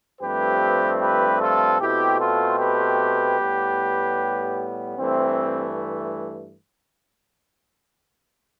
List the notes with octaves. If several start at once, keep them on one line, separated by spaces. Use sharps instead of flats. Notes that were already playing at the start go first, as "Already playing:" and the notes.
G2 F3 A3 C4 G4 B4
G4 B4
F4 A4
B2 A3 C4 E4 G4
F4 A4
G4 B4
A2 G3 B3
G2 E3 A3 C4